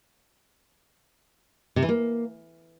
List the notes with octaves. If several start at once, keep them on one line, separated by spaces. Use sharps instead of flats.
C3
E3
A#3